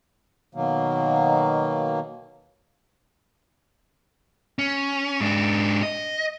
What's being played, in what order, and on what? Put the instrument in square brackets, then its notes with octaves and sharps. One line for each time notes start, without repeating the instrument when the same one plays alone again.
[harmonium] B2 D#3 F#3 A#3
[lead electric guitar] C#4
G#2 D4
D#5